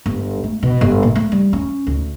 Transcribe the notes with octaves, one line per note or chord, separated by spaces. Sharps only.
G1
A3
B2
G1
A#2
A3
G3
C#4
D2